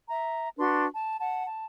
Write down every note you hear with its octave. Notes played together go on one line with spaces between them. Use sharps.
E5 A#5
D4 F#4 B4 C6
A5
F#5 A5
A5